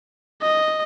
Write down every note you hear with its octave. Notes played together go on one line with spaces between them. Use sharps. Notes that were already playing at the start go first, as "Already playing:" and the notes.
D#5